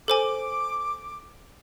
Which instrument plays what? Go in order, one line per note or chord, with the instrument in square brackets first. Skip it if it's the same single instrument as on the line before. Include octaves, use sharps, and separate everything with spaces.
[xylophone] A4 C5 G#5 [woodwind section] D6